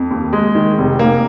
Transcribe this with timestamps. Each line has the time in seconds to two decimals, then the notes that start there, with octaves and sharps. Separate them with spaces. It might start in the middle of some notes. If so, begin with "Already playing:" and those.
Already playing: F2
0.11 D#2
0.33 G#3
0.55 D#3
0.78 F1
0.99 A#3